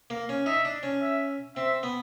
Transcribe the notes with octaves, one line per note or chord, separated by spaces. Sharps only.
A#3
C#4
D#4 E5
D4
C#4
E5
C4 E5
B3